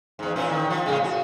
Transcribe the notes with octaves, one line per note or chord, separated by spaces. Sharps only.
E2 G#2
A#2 E3 C#4
D#3
F3
A2 C#3 G#3
F#4